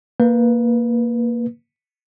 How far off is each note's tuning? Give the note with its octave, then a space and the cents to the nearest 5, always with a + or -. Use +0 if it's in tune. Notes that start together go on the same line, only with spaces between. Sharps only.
A#3 +0 B4 -15